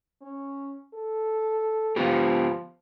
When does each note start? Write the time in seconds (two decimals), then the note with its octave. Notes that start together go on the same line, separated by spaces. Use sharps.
0.21 C#4
0.94 A4
1.96 F3 B3 F4 G4